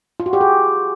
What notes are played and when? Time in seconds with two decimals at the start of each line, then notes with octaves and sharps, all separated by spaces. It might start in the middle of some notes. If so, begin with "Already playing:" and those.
0.20 F4
0.26 F#4
0.33 G4
0.41 G#4